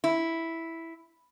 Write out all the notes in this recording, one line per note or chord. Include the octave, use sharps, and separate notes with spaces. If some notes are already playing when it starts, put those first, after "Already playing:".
E4